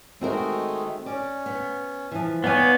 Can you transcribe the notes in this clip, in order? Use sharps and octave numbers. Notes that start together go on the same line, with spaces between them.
D#3 G#3 A3 C4 F#4 A#4
C#4 D5
B3
E3 F3
D#2 B3 C#5 D5 F5 G#5